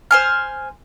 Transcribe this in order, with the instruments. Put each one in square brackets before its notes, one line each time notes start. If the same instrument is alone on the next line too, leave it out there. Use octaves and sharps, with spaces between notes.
[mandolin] C5 G#5 F6